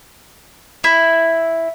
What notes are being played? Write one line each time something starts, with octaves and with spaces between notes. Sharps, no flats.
E4